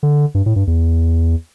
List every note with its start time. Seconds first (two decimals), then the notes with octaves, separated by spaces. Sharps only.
0.03 D3
0.35 G2
0.46 A2
0.56 G2
0.67 E2